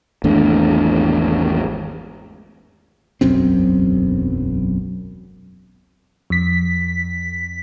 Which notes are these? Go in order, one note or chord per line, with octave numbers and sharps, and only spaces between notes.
G#1 E2 A3 D4
E1 B1 F#2 C4
F2 B6